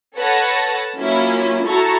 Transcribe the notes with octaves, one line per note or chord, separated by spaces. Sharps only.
A4 B4 C#5 F#5 A5 A#6
F#3 A#3 C#4 E4 F4
E4 F#4 A4 A5 A#5 C#6